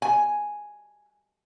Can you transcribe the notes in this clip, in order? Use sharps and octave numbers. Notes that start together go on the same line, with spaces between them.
G#5